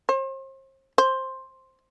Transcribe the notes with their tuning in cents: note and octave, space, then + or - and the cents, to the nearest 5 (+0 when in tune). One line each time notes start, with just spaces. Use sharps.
C5 +40
C5 +10